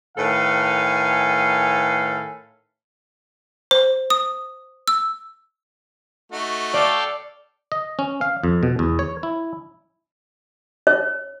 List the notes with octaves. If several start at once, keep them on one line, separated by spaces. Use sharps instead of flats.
A2 D#3 A4 B4 F5 G#5
C5
D#6
E6
A3 D#4 F#4
A4 D5 F5 G5
D#5
C#4
F5
F2
B2
E2
C#5
E4
C#5